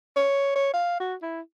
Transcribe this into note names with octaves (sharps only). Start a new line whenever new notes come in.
C#5
C#5
F5
F#4
E4